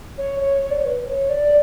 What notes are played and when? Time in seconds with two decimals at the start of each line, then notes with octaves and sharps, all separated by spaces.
0.18 C#5
0.40 C#5
0.62 C#5
0.70 D5
0.77 C#5
0.85 B4
1.07 C#5
1.29 D5